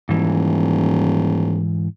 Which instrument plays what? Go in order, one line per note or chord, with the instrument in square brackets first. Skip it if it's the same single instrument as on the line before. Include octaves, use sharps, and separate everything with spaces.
[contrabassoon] D#1 [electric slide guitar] G#2 E3